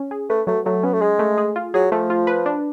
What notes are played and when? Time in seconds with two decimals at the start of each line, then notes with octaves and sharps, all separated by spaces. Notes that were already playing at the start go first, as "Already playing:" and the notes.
Already playing: C#4
0.11 G#4
0.29 A3 B4
0.47 F#3 A3
0.65 F#3 A3
0.83 B3 C#4
0.93 A3
1.01 G#3 G#4
1.19 A3
1.38 G#4
1.56 F4
1.74 F#3 G#4
1.91 F3 A3
2.10 F4
2.27 B4
2.46 D4